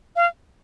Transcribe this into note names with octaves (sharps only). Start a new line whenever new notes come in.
F5